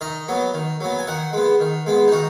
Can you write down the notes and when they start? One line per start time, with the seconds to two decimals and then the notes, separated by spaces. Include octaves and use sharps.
0.01 D#3 D#5
0.28 F#3 B3
0.54 D#3
0.80 F#3 B3
0.99 G#5
1.07 D#3 F#5
1.33 G#3 B3
1.60 D#3
1.86 G#3 B3
2.08 D#4
2.12 D#3 F#4